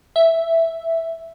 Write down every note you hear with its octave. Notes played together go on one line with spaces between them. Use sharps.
E5